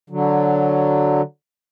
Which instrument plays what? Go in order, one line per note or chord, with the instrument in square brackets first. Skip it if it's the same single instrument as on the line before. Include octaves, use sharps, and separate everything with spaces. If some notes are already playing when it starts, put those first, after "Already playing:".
[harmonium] D3 F#3